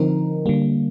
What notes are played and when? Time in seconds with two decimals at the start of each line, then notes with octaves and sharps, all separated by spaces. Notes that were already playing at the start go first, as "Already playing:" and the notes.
Already playing: D3 F3 C4 D#4 A#4
0.46 D3 G3 A#3